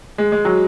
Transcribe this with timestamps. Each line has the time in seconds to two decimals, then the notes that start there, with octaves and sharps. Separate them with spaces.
0.18 G#3
0.32 G#3
0.45 F#3